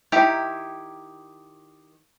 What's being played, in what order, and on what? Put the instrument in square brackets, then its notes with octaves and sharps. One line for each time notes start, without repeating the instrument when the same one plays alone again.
[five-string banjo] D#3 E4 G4 A#5